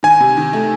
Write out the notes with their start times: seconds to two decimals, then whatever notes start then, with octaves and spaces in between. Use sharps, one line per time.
0.03 D#3 G#5
0.20 C3
0.37 D#3
0.53 A3